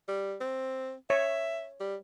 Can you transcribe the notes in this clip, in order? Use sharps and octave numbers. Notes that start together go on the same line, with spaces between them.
G3
C4
C#5 E5
G3